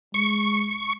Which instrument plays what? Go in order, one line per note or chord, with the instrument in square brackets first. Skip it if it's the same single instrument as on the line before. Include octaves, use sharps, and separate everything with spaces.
[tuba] G#3 [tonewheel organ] C#6